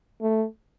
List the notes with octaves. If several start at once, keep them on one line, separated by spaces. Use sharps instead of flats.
A3